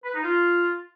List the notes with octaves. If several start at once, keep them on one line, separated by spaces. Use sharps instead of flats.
B4
D#4
F4